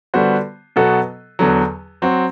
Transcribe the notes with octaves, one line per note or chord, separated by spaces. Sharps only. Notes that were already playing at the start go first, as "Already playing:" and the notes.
D3 G3 B3 F#4 C5
B2 F#3 B3 F#4 A4
E2 D3 F#3
F#3 C4 F#4